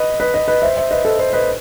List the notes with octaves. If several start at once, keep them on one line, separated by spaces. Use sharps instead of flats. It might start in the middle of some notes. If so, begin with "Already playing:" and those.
Already playing: B4 D#5
B4 D#5
B4 D#5
B4 D#5
C5 E5
C5 E5
B4 D#5
A4 C5
A4 C5
B4 D#5